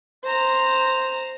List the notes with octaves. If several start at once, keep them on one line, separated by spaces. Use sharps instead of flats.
C5 A#5